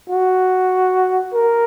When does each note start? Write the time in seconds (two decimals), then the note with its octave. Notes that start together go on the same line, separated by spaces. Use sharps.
0.10 F#4
1.34 A#4